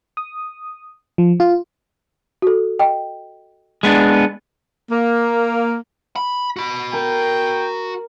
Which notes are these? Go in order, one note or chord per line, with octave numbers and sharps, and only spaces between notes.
D#6
F3
F4
F#4 A4
D#5 G5
G#3 B3 D4
A#3
B5
F#4 B5
A#4 G5